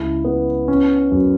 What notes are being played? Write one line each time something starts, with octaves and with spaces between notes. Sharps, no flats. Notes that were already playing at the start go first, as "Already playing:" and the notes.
Already playing: C#2 E4
B3
C#4
F#2